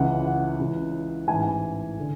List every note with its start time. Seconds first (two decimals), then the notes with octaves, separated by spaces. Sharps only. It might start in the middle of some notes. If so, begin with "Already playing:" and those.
Already playing: C#2 C#3 E3 F#5
0.25 F#5
0.59 C#2 C#3 E3
1.27 A1 G#2 E3 G#5
2.00 D3